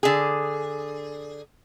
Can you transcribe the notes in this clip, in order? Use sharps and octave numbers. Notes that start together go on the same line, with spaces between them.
D3 G#4